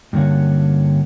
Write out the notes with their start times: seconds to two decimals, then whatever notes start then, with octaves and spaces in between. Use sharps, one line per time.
0.13 G2 D3 A#3 C#4 F#4